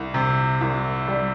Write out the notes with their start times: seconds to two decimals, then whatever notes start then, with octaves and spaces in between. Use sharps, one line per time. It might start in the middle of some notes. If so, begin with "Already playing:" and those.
Already playing: C2
0.14 C3
0.61 C2
1.08 G3